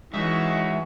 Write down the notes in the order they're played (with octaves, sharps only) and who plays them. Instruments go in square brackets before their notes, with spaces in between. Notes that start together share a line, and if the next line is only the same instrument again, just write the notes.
[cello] E3 [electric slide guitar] G#3 [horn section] C#4 D#4 F#4 [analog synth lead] E5